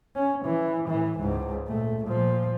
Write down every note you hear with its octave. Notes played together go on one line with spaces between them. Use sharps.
C#4
E3
A2 E3
C#2 G#2
A#2 A3
A#2 F3